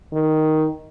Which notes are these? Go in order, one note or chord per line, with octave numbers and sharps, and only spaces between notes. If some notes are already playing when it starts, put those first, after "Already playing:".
D#3